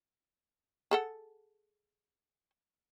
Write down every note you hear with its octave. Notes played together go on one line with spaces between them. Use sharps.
G#4 A4 F#5